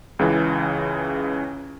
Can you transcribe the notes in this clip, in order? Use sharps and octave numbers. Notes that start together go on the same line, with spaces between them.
C#2 C#3 E3